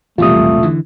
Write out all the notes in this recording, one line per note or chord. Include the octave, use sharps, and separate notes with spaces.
E1 A#1 E2 C3 G3 A3 F4 D#6
D3 E3